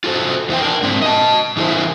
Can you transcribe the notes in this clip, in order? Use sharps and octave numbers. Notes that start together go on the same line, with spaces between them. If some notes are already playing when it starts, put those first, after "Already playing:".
F4 F#4 A4 B4 C5
F2 E3 D#4 E4 C5 G5
D4 A#4
G#2 G#3 C4 D4 A#4 D5
D#5 A5
E3 E4 G#4 A#4 C5